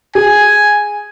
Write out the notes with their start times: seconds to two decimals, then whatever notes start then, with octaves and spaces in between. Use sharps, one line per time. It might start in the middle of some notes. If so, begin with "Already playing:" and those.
0.15 G#4 G#5